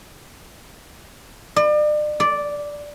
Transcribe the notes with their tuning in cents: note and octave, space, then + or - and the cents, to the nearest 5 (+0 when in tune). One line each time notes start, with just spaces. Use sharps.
D5 +40
D5 -5